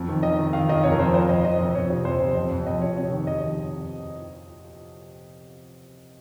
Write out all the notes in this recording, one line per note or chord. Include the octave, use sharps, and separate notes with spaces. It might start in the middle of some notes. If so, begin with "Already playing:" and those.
Already playing: F2
D#3
D#3 D#5
D#3
D#3 F5
D#3 D#5
F2 C#5
A#4
F2 C5
F3 C5
F2 D#5
F3 D#5
F2 D#5
F2 C#5
C3
F2 C5
F2
F2 D#5
F2
F2 D#5
C3 C#5
C3 C#5
D#3
F2 D#5
D#3